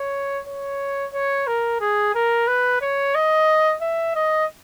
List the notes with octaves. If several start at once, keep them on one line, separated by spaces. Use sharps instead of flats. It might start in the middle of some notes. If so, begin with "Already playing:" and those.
Already playing: C#5
C#5
C#5
A#4
G#4
A#4
B4
C#5
D#5
E5
D#5